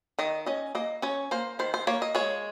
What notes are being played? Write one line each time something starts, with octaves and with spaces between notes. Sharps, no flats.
D#3 D#5
C#4 D#5
A#3 D#5
C#4 C#5
A#3 C5
D#3 C5
C5
A#3 C#5
D#5
G#3 C#5